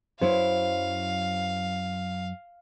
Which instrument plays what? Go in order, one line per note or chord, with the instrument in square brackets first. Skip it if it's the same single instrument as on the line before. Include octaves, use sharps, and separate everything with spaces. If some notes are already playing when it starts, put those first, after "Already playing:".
[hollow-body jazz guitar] F#2 F#3 E4 [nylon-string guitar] C5 [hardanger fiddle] F5